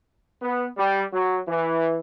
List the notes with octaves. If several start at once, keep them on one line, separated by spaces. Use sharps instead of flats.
B3
G3
F#3
E3